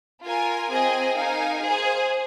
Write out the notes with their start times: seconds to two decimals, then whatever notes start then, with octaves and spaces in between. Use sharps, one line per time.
0.23 F4 A#4 G#5
0.70 C4 G#4 D#5 G#5
1.16 D#4 A#4 F5 G#5
1.62 G#4 C5 G#5